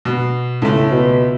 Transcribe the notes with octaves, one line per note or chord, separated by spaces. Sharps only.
B2
C#2 A2 A3
B2